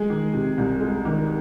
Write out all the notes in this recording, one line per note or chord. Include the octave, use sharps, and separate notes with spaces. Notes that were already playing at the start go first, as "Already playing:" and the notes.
Already playing: G#3 G#4
D#3
C3
C2
G#3
D#3